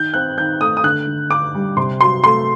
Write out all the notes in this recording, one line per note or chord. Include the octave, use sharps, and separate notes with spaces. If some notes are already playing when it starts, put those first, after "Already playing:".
Already playing: D#3 G6
C4 F#6
D#3 G6
A3 D#6
D#6
D3 F#6
D3
D4 D6
G3
C3 C6
F#3 C6
A3 C6